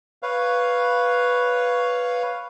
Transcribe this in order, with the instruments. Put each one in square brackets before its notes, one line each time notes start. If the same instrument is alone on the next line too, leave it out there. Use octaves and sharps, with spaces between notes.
[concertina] B4 C#5 F5